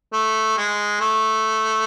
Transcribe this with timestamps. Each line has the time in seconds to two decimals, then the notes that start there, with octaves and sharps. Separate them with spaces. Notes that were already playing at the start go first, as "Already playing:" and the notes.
0.13 A3
0.57 G#3
1.00 A3